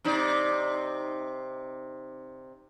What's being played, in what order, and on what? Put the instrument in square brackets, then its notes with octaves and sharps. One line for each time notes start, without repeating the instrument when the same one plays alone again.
[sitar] C3 D#4 D5